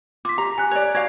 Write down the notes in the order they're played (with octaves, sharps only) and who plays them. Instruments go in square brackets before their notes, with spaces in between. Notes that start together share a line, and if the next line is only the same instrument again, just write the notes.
[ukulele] F4 [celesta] D6 B6
[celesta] G4 [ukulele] A#5
[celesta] G#5 F#6
[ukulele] C#5 D5
[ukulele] F#4 D5 F5 [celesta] G#6